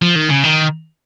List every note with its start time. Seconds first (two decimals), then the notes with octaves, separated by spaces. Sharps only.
0.02 F3
0.16 D#3
0.30 C#3
0.44 D#3